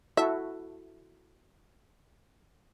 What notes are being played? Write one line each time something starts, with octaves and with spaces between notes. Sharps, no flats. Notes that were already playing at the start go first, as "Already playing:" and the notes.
E4 F#4 A4 E5